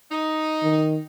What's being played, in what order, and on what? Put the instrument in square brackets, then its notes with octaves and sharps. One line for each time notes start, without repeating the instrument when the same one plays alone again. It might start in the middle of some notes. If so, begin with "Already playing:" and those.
[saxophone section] D#4
[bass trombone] D#3